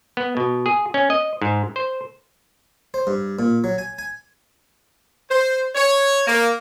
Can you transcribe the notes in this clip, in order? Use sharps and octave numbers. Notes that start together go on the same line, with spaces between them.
B3
B2
G#4
C#4
D#5
G#2
C5
C5
G2
A#2
F#3
G#5
G#5
C5
C#5
A#3